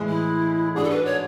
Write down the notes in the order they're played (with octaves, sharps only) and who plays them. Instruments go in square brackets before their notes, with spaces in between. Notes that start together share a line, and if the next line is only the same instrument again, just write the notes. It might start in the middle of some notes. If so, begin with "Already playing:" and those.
Already playing: [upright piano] A2 E3 G#3
[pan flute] E4
[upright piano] G#2 G#3 D4 F#4 [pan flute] G#4
[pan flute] A4
B4
C#5